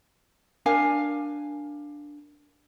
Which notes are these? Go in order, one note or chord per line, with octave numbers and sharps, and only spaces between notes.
D4 A#4 F5 G#5